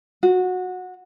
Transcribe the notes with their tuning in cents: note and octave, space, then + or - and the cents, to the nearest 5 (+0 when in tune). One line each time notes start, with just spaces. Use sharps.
F#4 -15